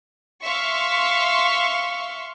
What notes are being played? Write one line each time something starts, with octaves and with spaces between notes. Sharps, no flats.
E5 F5 C6 C#6